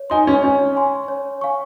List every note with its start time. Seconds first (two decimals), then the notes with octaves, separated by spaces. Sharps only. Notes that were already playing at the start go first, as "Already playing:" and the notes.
Already playing: C#5
0.10 D#4 G#5 C6
0.27 C#4
0.43 C#4 C#5
0.76 G#5 C6
1.08 C#5
1.41 F5 G#5 C#6